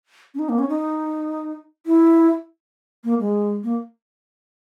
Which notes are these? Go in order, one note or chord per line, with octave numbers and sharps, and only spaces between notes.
C#4
D#4
A#3
C#4
D#4
E4
A#3
G#3
A#3